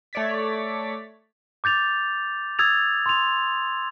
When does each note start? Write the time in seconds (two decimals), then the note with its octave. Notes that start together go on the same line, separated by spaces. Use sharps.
0.13 A3 C#5 D5 A6 B6
1.64 D6 G6 A6 F7
2.59 D#6 E6 G#6 A6 F7
3.06 C6 F7